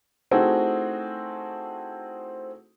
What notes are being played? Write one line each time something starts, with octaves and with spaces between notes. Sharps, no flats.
A3 C4 D#4 E4 F#4 G#4